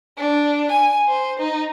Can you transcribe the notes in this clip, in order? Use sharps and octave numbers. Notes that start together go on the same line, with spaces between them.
D4
G#5
C5
D#4